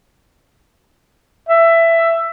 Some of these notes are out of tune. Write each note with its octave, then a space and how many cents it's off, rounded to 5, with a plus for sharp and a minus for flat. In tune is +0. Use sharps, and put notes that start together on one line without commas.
E5 +15